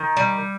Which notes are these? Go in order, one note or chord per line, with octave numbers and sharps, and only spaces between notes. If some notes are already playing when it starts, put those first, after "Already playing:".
Already playing: D#3
G3